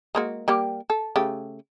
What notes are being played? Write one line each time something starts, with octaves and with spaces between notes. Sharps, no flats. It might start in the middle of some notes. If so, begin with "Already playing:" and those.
G#3 A#3 F#4
G3 A#3 G4
A4
C#3 A3 G4